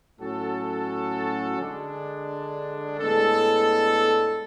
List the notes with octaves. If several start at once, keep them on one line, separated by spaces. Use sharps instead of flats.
A2 F#3 C#4 F#4 A4
D3 G#3 D4
A2 G#3 B3 D4 A4